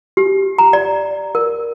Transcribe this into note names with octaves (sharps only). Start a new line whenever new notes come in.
G4
A#5
D5
A#4